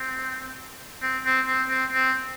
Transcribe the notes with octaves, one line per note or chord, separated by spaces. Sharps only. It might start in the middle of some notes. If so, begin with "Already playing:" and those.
Already playing: C4
C4
C4
C4
C4
C4